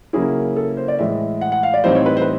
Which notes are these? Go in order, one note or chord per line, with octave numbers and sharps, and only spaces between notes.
C#3 F#3 A#3 C#4 E4 G#4
A4
C5
D5
A2 E3 G#3 E5
F#5
F#5
F5
D5
A2 E3 G3 C4 D#4 C5
C#5
B4
C5
B4